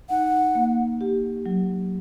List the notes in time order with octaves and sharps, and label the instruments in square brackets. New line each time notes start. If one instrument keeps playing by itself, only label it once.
[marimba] D#4 [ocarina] F#5
[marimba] A#3
G4
F#3